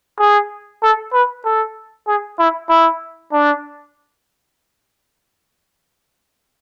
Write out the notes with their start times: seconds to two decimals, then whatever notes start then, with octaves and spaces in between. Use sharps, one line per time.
0.19 G#4
0.82 A4
1.13 B4
1.44 A4
2.07 G#4
2.39 E4
2.69 E4
3.32 D4